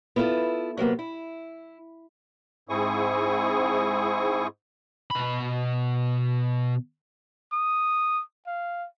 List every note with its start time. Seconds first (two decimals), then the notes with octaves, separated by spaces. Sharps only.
0.16 B3 E4 F4 G4 A4
0.77 C3 F#3 A#3 B3
0.99 E4
2.69 G#2 C4 E4 G#4 C#6 D#6
5.11 B2 B5
7.53 D#6
8.47 F5